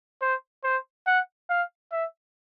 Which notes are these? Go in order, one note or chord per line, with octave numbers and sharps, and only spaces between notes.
C5
C5
F#5
F5
E5